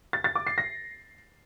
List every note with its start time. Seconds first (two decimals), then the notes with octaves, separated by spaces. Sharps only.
0.13 A6
0.24 A6
0.35 D6
0.47 C7
0.58 A#6